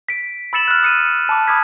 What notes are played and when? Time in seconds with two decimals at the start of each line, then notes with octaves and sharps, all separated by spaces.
0.09 B6 D7
0.53 B5 E6 A6 C#7 E7 F#7
0.68 F6 F#6
0.83 D#6 C#7 D#7
1.29 A5 B5 D6
1.47 B5 D6 D#6 F6 G#6 B6